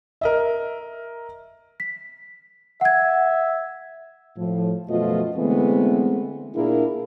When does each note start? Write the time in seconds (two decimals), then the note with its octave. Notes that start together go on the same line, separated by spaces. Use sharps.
0.21 A#4 D#5 E5
1.80 B6
2.81 E5 F#5 G#6
4.38 A2 F3
4.89 F#2 B2 F3 A3 F4 D#5
5.37 D3 E3 G#3 A3 B3 C4
6.55 A#2 A#3 D4 E4 G#4 A#4